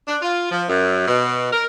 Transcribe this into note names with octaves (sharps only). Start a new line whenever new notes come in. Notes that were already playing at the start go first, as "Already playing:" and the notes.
D4
F4
F3
F#2
B2
A#4